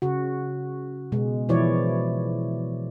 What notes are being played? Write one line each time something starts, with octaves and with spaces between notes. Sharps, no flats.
C#3 F#4
B2 G#3
B2 E3 F3 E4 C#5 D5